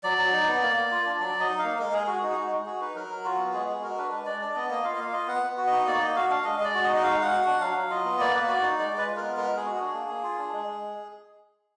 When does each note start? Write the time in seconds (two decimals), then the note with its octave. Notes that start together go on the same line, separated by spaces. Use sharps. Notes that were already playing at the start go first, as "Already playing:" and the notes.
0.04 F#3 D5
0.18 F#3
0.33 D#4
0.48 B3
0.62 A#3
0.77 A#3
0.91 F4
1.06 D4
1.20 F#3 D5
1.35 F#3
1.40 D#5
1.49 D#4
1.59 A#3 F5
1.79 G#3 A#4
1.93 G#3 G#4
2.07 F#4 G#4
2.23 D#4 F#4
2.32 G#4
2.36 G#3 F#4
2.51 G#3
2.66 F#4 G#4
2.81 D#4 B4
2.95 F#3 A#4
3.09 F#3
3.24 F4 F#4
3.38 B3
3.53 G#3 G#4
3.68 G#3 G#4
3.82 F#4 A#4
3.97 D4 B4
4.12 G#3 B4
4.26 G#3 D5
4.41 D4 D5
4.56 B3 D#5
4.69 A#3 D#5
4.84 F4 F5
4.95 D#5
4.99 A#3 F5
5.13 F4 D#5
5.28 B3 F#5
5.43 B3
5.57 F#4
5.67 D#5
5.72 D#4
5.86 A#3 D5
6.01 A#3 D#5
6.16 F#4 F5
6.30 D4 F5
6.44 G#3 D#5
6.59 G#3 D#5
6.64 D5
6.75 F#4
6.84 D#5
6.89 D#4
6.96 D#5
7.03 G#3 F5
7.17 G#3 F#5
7.32 F#4
7.42 D4 F#5
7.61 F#3 F5
7.77 F#3
7.90 F4 D#5
8.05 B3
8.19 A#3 D5
8.34 A#3 B4
8.48 F#4 D5
8.63 D#4
8.78 G#3 D5
8.93 G#3 B4
9.07 F4
9.17 A#4
9.22 B3
9.37 G#3 A#4
9.51 G#3
9.56 G#4
9.65 F#4
9.76 D4 G#4
9.94 A#3
10.09 A#3
10.23 F4
10.38 D4
10.53 G#3
10.67 G#3